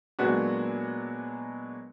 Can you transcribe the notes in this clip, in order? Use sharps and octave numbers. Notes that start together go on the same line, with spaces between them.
A#2 F#3 G#3 B3 D4 F#4